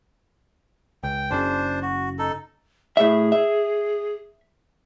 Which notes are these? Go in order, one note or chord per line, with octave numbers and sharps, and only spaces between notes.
C#2 G5
F#1 C#3 D4 C5
F#4
D#4 A4
A2 G#4 E5
E5